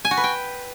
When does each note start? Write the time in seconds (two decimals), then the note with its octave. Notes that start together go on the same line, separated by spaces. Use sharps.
0.05 G#5
0.11 F#4
0.17 B4
0.24 G5